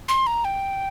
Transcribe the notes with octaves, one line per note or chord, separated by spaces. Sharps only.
C6
A#5
G5